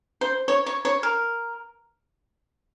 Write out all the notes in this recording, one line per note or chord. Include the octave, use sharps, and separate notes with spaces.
C5
C#5
C#5
C#5
A#4